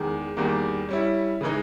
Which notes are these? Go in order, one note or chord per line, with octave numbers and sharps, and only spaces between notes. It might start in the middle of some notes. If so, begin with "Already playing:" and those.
Already playing: E2 D#3 G#3
E2 D#3 G3 A#3
G3 C#4 E4
C#3 E3 G#3 D#4